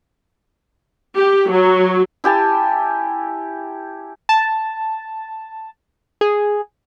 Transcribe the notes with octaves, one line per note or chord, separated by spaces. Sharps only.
G4
F#3
E4 G4 G#5 A5
A5
G#4